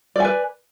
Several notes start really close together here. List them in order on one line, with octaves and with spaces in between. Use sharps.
D5 G#5 B4